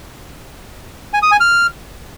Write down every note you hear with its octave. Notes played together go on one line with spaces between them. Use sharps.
G#5
D#6
G#5
F6